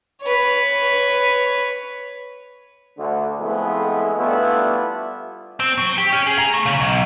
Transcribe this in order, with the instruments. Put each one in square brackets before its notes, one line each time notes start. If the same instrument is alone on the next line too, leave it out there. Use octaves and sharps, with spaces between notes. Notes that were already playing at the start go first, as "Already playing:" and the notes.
[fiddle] B4 C#5
[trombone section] D2 D3
F3 G#3 A3 B3 C4 E4
G3 A3 B3 D4 E4 F4
[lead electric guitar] C4
F#3
G4
C#4
G#4
A#5
A3
C#3
B1